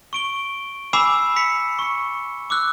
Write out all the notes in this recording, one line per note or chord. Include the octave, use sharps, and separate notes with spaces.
C#6 D7 G7
G#5 B5 D6 E6 C7 E7
B5 B6 C#7
C#6 C#7
D6 E6 F#6